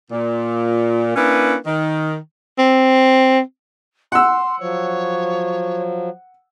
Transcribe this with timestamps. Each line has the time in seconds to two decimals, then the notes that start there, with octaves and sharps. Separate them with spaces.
0.11 A#2
1.16 A#3 C#4 D4 E4 B4
1.65 D#3
2.58 C4
4.12 F#5 C6 E6
4.60 F3 F#3 C#5